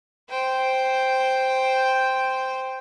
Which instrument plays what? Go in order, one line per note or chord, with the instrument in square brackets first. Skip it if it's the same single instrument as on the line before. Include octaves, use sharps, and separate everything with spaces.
[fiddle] C5 G5